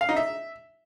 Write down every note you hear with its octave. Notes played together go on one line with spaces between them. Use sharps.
F5
D#4
E5